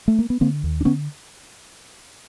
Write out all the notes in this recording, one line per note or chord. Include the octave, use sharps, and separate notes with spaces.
A3
A#3
B3
D3 A#3 C4
D#2
D4
D3 B3 C#4